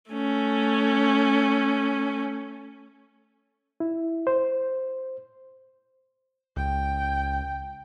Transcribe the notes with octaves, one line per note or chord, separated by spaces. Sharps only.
A3 C#4
E4
C5
C#2 G5